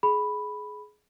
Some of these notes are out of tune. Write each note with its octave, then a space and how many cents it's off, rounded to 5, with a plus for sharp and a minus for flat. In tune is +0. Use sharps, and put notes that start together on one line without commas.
G#4 +20 B5 +0